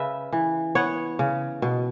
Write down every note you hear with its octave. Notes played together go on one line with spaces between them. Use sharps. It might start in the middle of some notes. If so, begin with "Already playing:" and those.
Already playing: C#3 B4 E5
E3
B3 C#5 F#5
C#3
B2